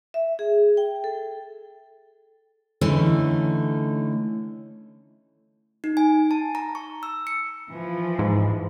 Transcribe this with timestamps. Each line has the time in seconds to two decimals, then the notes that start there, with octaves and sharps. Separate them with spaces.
0.14 E5
0.39 G#4
0.77 G5
1.04 A4
2.81 D3 E3 A3 C#4 D#4
5.84 D#4
5.97 G#5
6.31 A5
6.55 A#5
6.75 C#6
7.03 E6
7.27 C#7
7.70 E3 F3
8.19 G#2